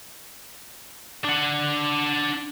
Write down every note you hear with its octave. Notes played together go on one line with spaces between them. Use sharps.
D4 F#5